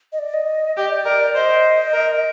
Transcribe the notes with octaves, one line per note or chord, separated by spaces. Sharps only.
D#5
D5
D#5
G4 D#5
D5
A#4
C5 D#5
A#4